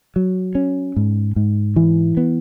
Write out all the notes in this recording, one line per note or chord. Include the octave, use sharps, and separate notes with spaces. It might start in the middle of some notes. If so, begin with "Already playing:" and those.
F#3
C#4
G#2
G#2
E3
B3